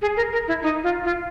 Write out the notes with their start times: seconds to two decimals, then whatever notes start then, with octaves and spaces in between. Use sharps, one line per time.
0.02 G#4
0.17 A#4
0.33 A#4
0.48 E4
0.63 D#4
0.84 F4
1.05 F4